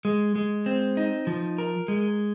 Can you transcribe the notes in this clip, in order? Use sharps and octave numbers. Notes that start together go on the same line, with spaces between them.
G#3
G#3
C4
D#4
F3
A#4
G#3